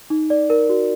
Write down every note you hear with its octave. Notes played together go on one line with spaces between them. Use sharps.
D#4
D5
A#4
F#4